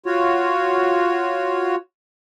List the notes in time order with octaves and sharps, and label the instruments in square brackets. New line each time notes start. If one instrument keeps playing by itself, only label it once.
[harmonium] F4 F#4 C#5